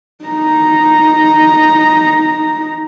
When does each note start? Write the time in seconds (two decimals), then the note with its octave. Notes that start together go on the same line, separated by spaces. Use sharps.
0.25 D#4 A#5